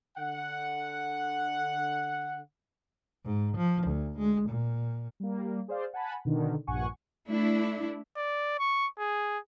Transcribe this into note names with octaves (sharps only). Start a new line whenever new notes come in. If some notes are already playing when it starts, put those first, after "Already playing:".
D3 F#5
G#2
F3
D2
G#3
A#2
G3 A#3
G#4 C5 D5 F5
F#5 G#5 A5 B5
B2 D3 D#3
A#1 G2 F#5 G#5 C#6
A3 D4 E4
D5
C#6
G#4